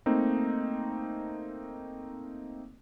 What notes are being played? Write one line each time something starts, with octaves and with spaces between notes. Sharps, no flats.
A3 A#3 C4 D#4